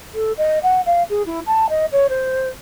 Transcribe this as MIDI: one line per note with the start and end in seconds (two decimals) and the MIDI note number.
0.14 0.32 69
0.37 0.59 75
0.63 0.81 78
0.86 1.03 77
1.09 1.22 68
1.26 1.40 64
1.47 1.66 81
1.69 1.86 75
1.92 2.07 73
2.09 2.47 72